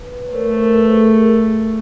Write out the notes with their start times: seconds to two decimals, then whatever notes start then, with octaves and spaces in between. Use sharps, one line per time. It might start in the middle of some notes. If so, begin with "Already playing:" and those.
Already playing: B4
0.27 C#5
0.32 A3 A#4 C5
0.52 A#4 C5
0.71 A4 B4
0.91 G#4 A#4
1.10 G#4 A#4